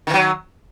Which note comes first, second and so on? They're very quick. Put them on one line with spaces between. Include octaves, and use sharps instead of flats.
D#3 E3 F#3